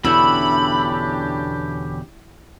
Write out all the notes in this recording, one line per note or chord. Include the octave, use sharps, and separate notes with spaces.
E2 B2 D3 C#4 D4 E4 G4 B5